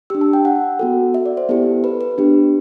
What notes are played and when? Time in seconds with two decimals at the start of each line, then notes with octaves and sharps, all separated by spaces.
0.10 D4 G4 E6
0.21 A5
0.33 G5
0.45 F#5
0.79 B3 F#4 A4
1.14 E5
1.26 D5
1.37 C5
1.49 B3 E4 G4 A4
1.84 B4
2.01 B4
2.18 B3 D4 G4